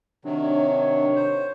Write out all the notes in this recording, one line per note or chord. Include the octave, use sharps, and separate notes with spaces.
C3 D#3 F#3 D4 C#5
C5